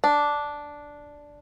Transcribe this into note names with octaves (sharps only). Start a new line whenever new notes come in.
D4